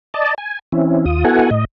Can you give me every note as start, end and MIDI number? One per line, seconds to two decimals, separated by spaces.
0.14 0.34 74
0.14 0.34 75
0.14 0.34 81
0.38 0.59 80
0.72 1.06 52
0.72 1.06 60
0.72 1.06 61
0.72 1.06 64
1.06 1.24 39
1.06 1.24 65
1.06 1.24 87
1.24 1.50 59
1.24 1.50 64
1.24 1.50 66
1.24 1.50 69
1.24 1.50 78
1.24 1.50 80
1.51 1.65 45
1.51 1.65 75